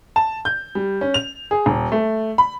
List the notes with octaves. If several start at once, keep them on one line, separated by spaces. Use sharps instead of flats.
A5
G6
G3
C#4
F7
G#4
D#1
A3
B5